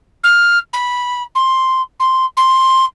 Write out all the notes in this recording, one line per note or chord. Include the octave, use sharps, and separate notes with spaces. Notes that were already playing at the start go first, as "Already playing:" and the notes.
F6
B5
C6
C6
C6